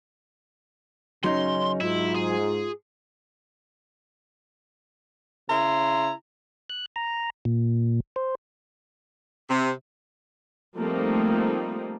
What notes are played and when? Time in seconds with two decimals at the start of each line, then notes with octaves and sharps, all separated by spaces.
1.24 F#2 C#3 F#3 C#4 D#4 C6
1.81 G#2 E4 F4
2.15 G#4
5.50 C#3 E4 A#5 C6
6.70 F#6
6.96 A#5
7.45 A#2
8.16 C5
9.50 C3
10.77 F3 G3 A3 A#3 C4 D#4